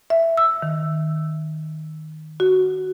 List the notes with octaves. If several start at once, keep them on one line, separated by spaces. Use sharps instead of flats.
E5
E6
D#3
F#4